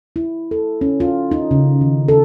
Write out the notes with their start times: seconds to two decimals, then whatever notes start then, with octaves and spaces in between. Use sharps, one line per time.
0.16 E4
0.51 A4
0.81 C#4
1.00 F4
1.31 D#4
1.51 C#3
1.81 D#3
2.08 A4